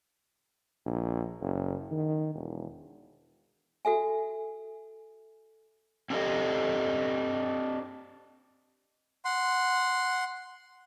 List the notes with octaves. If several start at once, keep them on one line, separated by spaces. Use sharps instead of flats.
A#1
F#1
D#3
E1
F#4 A4 E5 G#5
C4 D4 G4 A4 D#5 F5
F#5 C6